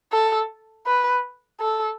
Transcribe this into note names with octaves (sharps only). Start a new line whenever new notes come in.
A4
B4
A4